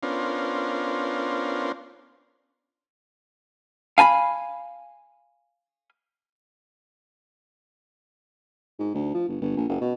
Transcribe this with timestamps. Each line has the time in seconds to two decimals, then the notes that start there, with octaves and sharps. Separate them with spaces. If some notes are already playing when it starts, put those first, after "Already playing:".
0.03 B3 C#4 D4 F4 A#4 C5
3.98 F5 G#5 A5 B5
8.79 G#2
8.94 D2
9.14 F3
9.28 G1
9.41 G1
9.57 A#1
9.69 F#1
9.81 B2